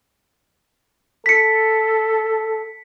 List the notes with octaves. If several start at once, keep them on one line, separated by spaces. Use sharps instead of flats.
A4 B6 C#7